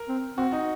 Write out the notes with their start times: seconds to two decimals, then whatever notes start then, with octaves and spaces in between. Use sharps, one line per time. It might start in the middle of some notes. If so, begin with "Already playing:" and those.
Already playing: A#4
0.09 C4
0.37 C4 F#4
0.52 D#4